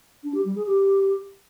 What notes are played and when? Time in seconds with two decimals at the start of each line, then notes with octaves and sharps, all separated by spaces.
0.24 D4
0.34 G4
0.45 G3
0.56 G#4
0.66 G4